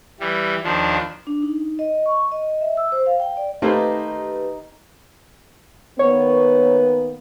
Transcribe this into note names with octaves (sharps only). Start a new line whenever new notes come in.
E3 G3
D#2 F3 D4
D4
D#4
D#5
C#6
D#5
E5
E6
C5
F5
G5
D5
A3 A#3 C4 D#4 G4 B4
D#3 A#3 B3 C#5